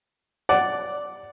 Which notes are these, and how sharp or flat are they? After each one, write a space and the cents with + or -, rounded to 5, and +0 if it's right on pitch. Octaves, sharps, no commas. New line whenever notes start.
D5 -5 F#5 +10